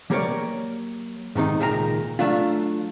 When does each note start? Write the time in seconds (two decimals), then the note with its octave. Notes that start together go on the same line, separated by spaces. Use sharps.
0.10 F#3 A#3 G4 A#4 C#5 D5
1.35 G#2 C3 D#3 D#4
1.59 C#2 A#2 D#3 G#4 A#5
2.19 F#3 A3 D4 F4